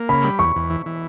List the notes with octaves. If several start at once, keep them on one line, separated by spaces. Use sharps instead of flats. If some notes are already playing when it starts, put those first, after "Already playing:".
Already playing: A#3
C#3 B5
G3
E2 C#6
E2
E3
E3